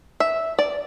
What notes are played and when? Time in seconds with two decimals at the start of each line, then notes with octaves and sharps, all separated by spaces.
0.20 E5
0.59 D5